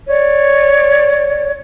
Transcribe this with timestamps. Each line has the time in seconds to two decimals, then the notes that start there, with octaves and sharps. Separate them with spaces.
0.08 C#5 D5